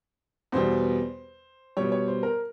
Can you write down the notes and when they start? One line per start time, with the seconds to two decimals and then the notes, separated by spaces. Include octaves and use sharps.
0.52 E2 B2 G3 C5
1.77 B2 G3 C#5
1.92 C#5
2.08 C5
2.23 A#4